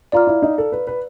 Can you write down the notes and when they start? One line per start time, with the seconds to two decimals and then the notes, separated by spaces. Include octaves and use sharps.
0.12 F4 D5 F5 A#5 D6 F6
0.27 E4
0.42 D#4
0.58 A4
0.72 B4
0.87 B4